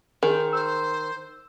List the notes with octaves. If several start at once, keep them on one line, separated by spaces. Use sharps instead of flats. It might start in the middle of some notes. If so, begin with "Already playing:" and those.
D#3 G#4 C5
C5 E6